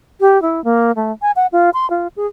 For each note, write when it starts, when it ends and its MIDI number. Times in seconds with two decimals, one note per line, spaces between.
0.20 0.40 67
0.42 0.63 64
0.64 0.91 58
0.96 1.12 57
1.22 1.31 80
1.36 1.47 78
1.52 1.70 65
1.74 1.89 84
1.90 2.08 65
2.17 2.26 68